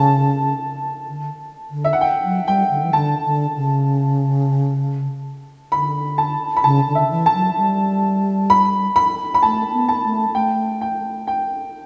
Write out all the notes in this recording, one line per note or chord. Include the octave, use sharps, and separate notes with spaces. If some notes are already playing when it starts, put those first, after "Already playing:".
Already playing: C#3 A5
D3
D3
E5
F#5
G5
F#3
G3 G5
D3
E3
D3 A5
D3
C#3
D3 B5
A5
B5
C#3 A5
D3
E5
E3
A5
F#3
G3
B5
B5
B5
A3 A5
B3
A5
A3
A3 G5
G5
G5